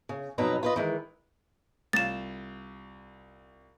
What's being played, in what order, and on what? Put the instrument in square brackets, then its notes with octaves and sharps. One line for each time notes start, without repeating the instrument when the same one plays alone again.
[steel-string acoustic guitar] C#3
F2 B2 F#3 D#4 B4 A#5
F4 B4 D#5
D#3 E3 G#3
[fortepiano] C2 F4 [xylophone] A6 E7